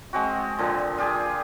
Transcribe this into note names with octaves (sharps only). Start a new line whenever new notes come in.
G#3 C4 F#4
A#2 D3 F3
F4 G4 G#4